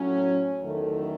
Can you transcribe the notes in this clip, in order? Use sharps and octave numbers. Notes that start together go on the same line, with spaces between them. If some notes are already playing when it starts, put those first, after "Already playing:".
Already playing: A2 F#3 C#4
E2 D#3 F#3 A3